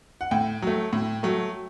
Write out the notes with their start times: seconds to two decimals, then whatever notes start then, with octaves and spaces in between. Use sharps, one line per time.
0.21 F#5
0.31 A2 G5
0.62 F#3 A3
0.93 A2
1.23 F#3 A3